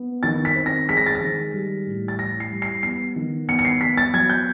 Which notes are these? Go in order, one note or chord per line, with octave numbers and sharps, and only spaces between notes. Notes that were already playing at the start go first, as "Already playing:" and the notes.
Already playing: B3
D#3 A6
B6
C4
A#6
G#3 B6
A#6
A6
A#6
D#3
G3
A2
A6
E3 A#6
C7
G3
C7
B3 C7
D#3
B3 C#7
C#7
C7
B3 B6
A6
F#3 G#6
G6